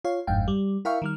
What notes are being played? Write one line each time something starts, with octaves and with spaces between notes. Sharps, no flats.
F4 C#5 F5
G1 F2 G#2 F5 G5
G3
E4 A#4 E5 F5 G5 C#6
D#3 G3 F6